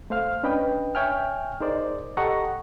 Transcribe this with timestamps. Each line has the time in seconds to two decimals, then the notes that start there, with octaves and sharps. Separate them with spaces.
0.10 A3 C5 F5 F6
0.43 C#4 D4 B4 D#5 G5
0.95 C#5 E5 G5 G#5 F6
1.60 D#4 G#4 A#4 C5 D5 D#5
2.17 G4 A4 D#5 F#5 A#5 C#6